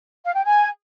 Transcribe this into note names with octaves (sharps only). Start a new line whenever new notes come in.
F5
G5
G#5